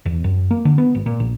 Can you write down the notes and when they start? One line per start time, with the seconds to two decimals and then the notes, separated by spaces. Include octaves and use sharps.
0.06 E2
0.24 F#2
0.51 A#3
0.65 D3
0.78 B3
0.95 G#1
1.06 A#2
1.20 A#1